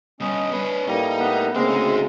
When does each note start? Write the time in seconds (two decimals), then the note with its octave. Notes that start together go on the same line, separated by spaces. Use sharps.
0.21 G3 B3 C#4 D#5
0.52 D4 B4 C#5
0.88 A2 G3 A#3 D#4
1.20 B3
1.55 D2 C#3 G#3 A#3 C4
1.69 D#4 G#4